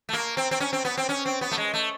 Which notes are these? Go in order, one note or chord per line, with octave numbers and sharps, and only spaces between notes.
A3
A#3
C4
C4
C#4
C4
B3
C4
C#4
C4
B3
A3
G#3
A3